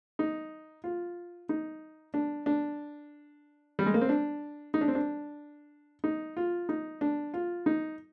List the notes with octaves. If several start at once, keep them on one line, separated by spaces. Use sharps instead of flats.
D#4
F4
D#4
D4
D4
G3
G#3
A#3
C4
D4
D#4
D4
C4
D4
D#4
F4
D#4
D4
F4
D#4